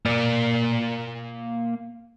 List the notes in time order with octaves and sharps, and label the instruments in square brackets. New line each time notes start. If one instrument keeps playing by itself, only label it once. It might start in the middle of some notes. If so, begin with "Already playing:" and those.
[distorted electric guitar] A#3 D5